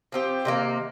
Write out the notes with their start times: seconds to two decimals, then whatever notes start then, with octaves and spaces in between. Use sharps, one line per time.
0.12 F3 C4 G4
0.45 C3 D#3 A#3